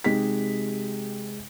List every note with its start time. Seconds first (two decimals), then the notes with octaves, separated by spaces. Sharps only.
0.04 C3 G#3 D#4 G4 B6